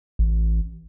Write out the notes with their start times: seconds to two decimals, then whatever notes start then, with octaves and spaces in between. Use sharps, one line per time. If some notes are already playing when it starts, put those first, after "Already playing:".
0.19 A1